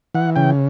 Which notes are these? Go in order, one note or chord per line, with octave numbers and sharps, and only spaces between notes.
E3 F#5
C#3 G5